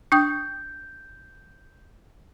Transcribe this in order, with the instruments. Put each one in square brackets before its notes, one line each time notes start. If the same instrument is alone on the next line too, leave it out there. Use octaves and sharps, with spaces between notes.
[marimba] D4 G5 D#6 [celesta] G6